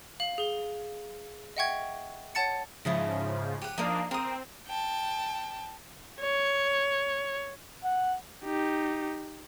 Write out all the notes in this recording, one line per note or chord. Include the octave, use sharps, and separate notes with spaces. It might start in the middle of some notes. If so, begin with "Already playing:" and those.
F5 F#7
G#4 G7
D#5 E5 F#5 G5 C#6 G#6
C#5 F#5 A5 A6 C#7
G#2 C#3 F3 E4 D#5 A5
G4 F#5 D#7
F3 A#3 D4 D#4 D#6
C4 A#4 D#6
G5 A5
C#5
F#5
D#4 G4